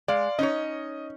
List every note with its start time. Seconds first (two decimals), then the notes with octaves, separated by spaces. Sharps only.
0.08 G#3 D5 F5
0.39 C#4 D#4 C#5 D#5